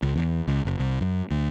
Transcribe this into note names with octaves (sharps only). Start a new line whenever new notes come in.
C#2
E2
C#2
F#1
C2
F#2
D2